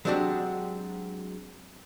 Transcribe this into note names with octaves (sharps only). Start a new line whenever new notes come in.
F#3 G#3 C4 D4 F#4 G4